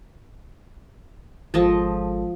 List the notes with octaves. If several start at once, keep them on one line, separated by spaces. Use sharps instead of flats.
G#1 F3 G#3 A4 D#5 A5